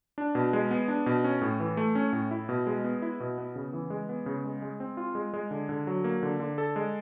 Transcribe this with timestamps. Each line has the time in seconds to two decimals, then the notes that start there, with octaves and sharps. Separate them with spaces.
0.18 D4
0.35 B2
0.53 G#3
0.71 B3
0.88 D4
1.06 B2
1.24 C#4
1.41 A2
1.60 E3
1.77 A3
1.95 C#4
2.13 A2
2.31 E4
2.49 B2
2.67 G#3
2.84 B3
3.02 E4
3.20 B2
3.38 B3
3.56 C#3
3.73 E3
3.90 G#3
4.09 B3
4.26 C#3
4.44 G#3
4.62 G#3
4.80 C4
4.97 F4
5.15 G#3
5.34 G#3
5.51 D3
5.69 D3
5.87 F#3
6.04 A#3
6.23 D3
6.40 D3
6.58 A4
6.76 G#3